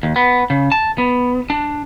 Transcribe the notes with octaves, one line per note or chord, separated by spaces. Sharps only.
D#2
B3
C#3
A5
B3
D4